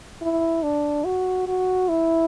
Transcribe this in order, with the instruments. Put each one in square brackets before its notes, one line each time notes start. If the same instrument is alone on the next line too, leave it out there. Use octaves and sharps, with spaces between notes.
[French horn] E4
D4
F#4
F#4
E4